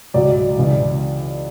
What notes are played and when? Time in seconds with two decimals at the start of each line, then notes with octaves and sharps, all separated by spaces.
0.14 C#2 C#3 F#3 D5
0.57 C#2 C#3 E3